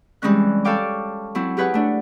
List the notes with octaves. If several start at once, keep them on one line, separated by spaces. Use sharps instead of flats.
E3 G3 G#3 C4 C#4 F#6
A4 C#5 F5 G5 D6
F#3 C4 E4
G4 G#4 B4 C#5 F#5
A3 D4